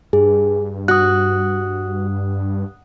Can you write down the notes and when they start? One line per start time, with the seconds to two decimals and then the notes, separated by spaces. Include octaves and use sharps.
0.13 G2 G#4
0.88 F#4 D#6 F#6